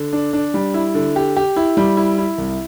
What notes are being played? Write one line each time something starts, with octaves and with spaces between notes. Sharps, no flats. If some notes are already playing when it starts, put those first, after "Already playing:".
Already playing: D3
D4
D4
G3
E4
D3
G4
G4
E4
G3
E4
E4
C2